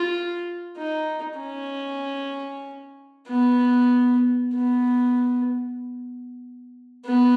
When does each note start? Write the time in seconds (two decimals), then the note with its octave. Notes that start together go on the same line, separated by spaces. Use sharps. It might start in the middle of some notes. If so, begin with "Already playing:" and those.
Already playing: F4
0.78 D#4
1.40 C#4
3.28 B3
4.54 B3
7.06 B3